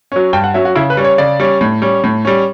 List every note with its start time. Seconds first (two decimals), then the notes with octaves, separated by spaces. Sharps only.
0.12 F#3 C#4
0.33 G2 G5
0.44 F#5
0.54 F#3 C#4 E5
0.65 F#4
0.75 C#3 E4
0.90 B4
0.97 G3 C#4
1.04 C#5
1.18 C#3 D5
1.40 G3 C#4
1.61 A2
1.82 G3 C#4
2.04 A2
2.25 G3 C#4